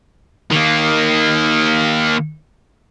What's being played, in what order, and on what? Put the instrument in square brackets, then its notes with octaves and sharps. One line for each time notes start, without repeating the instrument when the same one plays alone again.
[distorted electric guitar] D#3 A#3